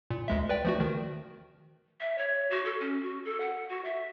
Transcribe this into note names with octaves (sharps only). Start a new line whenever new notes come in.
A#2
D2 G#3 E5
B4 D5 G5
F3 A3 F#4
D#3
E5
C#5
F#4
A4
C#4
F#4
A4
F#5
F#4
E5